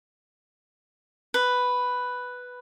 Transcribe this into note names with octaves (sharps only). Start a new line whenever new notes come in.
B4